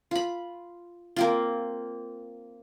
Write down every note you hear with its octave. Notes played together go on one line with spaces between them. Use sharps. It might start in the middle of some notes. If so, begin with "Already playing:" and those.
F4 B5
A#3 C4 F4